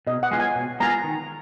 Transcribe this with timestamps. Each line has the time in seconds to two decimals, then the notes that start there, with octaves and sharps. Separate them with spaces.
0.07 B2 D#5
0.23 F#5
0.31 G#3 B3 F4 G#4
0.39 G#5
0.55 B2
0.80 G#3 B3 F4 G#4 A#5
1.04 D#3